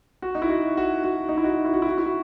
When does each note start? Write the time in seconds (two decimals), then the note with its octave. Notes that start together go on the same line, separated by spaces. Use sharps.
0.22 F#4
0.35 D#4
0.42 E4
0.50 F#4
0.77 F#4
1.04 F#4
1.29 D#4
1.37 E4
1.44 F#4
1.65 E4
1.73 F#4
1.82 E4
1.89 F#4
1.98 E4
2.06 F#4